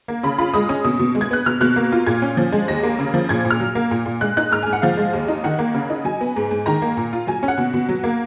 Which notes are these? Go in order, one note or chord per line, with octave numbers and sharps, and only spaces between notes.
A#3
C#3 B5
F4 B5
G#3 D#6
C#4 D#6
B2 D#6
B2
G#3
G#6
B3 F#6
B2 F6
B2 F#6
A#3
F4
A#2 G#6
C#4
F3
G#3
D#2 A#6
A#3
C#3
F3
A#2 G#6
A#2
F6
F#3
A#3
A#2
A#2
G#3 F#6
D#4 F#6
G#2 F6
G#2 G#5
F#5
F3 F5
G#3
D#2
D#4
D#3 F#5
A#3
C#3
D#4
F#3 G#5
B3
G#2
G#2
D#3 A#5
A#3
A#2
F4
F#3 G#5
C#4
F#5
B2
B2
F#3
A#3